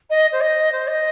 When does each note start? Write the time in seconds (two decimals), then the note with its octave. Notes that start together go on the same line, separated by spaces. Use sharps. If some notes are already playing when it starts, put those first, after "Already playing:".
0.10 D#5
0.32 C5
0.40 D#5
0.72 C5
0.87 D#5